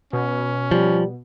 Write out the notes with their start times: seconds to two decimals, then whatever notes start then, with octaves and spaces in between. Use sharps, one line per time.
0.13 B2 C#4
0.71 F3 G3